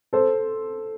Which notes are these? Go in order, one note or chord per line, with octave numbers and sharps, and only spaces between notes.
A4 C5